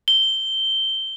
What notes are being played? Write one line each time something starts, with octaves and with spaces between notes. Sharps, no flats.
G7